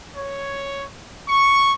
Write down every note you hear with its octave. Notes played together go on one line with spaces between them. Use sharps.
C#5
C#6